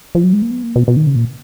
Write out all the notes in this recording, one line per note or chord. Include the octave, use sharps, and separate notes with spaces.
F3
F#3
G#3
A#3
B3
A#3
B2
B2
D#3
C#3
A#2